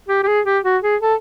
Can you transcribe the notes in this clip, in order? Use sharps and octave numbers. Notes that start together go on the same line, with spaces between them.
G4
G4
G#4
G4
F#4
G#4
A4